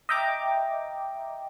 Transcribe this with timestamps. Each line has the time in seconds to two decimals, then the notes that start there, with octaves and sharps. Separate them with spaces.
0.09 D#5 E5 G5 A#5 D6